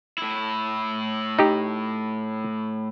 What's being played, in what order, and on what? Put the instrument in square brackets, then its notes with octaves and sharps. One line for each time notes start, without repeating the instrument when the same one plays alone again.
[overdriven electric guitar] A2 E4
[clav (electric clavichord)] D#4 G4